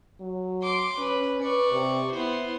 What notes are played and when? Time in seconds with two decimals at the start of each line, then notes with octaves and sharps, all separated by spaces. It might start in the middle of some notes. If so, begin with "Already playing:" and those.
0.21 F#3
0.63 C6 D6
0.98 C#4 B4
1.42 B4 D5 C#6
1.72 C3
2.13 B3 E4 C5